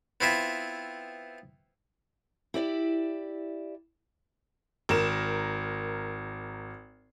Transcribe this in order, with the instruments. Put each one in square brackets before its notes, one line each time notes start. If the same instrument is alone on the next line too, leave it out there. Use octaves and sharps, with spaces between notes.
[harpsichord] B3 C4 E4 F4 E5
[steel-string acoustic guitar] E4 G4 D5 E5
[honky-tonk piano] G#1 A#4 E7